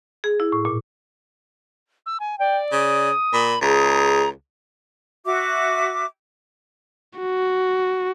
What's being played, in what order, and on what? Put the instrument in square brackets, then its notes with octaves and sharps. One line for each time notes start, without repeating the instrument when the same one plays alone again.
[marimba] G#4
E4
A2
A#2
[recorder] E6
G#5
[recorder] D5 [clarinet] G5
[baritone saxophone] C#3 [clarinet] D#6
[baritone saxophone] A#2 [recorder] B5
[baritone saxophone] C#2 [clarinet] G#4 [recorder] A#5
[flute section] F#4 E5 D6
[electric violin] F#4